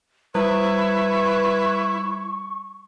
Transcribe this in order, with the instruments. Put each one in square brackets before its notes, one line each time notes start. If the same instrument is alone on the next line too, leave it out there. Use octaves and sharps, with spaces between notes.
[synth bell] G3 [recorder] E4 [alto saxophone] B4 [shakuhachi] C#6